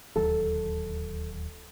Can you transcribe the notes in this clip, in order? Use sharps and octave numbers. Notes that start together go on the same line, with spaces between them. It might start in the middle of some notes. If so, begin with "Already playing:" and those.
D1 D#2 F#3 A4